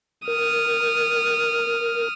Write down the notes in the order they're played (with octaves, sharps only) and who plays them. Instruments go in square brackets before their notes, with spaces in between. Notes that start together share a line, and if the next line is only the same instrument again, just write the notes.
[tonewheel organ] A#4 [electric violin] D#6 F6